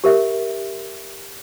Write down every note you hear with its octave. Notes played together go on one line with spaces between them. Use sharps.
G4 A#4 E5